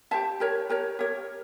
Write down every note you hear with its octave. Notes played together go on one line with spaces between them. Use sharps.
G4 C5 E5 A5
G4 A#4 C#5
G4 A#4 C#5
G4 A#4 C#5